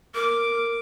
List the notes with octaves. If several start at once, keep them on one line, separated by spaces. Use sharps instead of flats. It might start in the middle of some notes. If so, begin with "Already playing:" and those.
A#4 D6